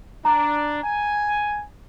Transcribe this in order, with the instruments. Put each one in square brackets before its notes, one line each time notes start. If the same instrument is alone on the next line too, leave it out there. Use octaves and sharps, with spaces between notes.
[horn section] D4 [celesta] A#5
[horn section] G#5